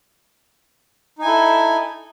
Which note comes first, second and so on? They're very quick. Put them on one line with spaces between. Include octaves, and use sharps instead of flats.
D#4 G#5 E4 A4